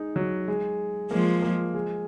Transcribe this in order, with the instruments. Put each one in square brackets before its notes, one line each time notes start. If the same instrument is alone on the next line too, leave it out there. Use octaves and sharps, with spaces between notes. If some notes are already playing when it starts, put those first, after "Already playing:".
Already playing: [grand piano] G#3 D#4
F#3
G#3
[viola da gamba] F3 G#3 [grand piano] A#3
[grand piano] A#3
G#3